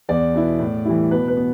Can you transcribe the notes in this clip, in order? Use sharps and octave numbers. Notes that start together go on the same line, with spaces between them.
E2 D5
B2 B3 E4
A2
E3 G3 E4
B2 B4
B4
B3